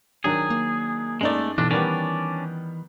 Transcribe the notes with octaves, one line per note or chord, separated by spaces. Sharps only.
D#3 F#3 D4 G#4
A#3
F#2 G#3 A3 D#4 D5
B1 E3 D4
D#3 G3 B3 C#4 D4 D5